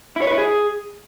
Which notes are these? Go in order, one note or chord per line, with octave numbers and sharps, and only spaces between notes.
E4
C#5
B4
E4
G#4